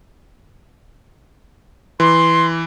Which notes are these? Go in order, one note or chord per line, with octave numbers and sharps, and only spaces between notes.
E3 C6